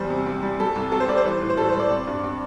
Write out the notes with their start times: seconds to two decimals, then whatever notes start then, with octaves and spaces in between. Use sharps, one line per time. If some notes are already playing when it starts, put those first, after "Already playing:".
Already playing: E2 G3 C5
0.10 C3
0.26 C4
0.43 G3
0.59 G3 A4
0.76 C2
0.92 C4 A4
1.00 C5
1.08 G3 D5
1.17 C5
1.25 E3
1.41 A2
1.49 C5
1.57 G3 A4
1.69 C5
1.74 G3
1.79 D5
1.91 C4
2.07 G2
2.24 C4